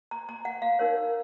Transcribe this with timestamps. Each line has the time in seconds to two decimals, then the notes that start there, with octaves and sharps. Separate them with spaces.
0.11 A#5
0.29 A#5
0.45 F#5
0.62 F5
0.79 D#4 A#4 C#5